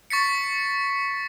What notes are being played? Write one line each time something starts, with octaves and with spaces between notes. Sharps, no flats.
C#6 A6 B6 C#7